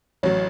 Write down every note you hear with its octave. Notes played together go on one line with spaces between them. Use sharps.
A1 F#3 C#5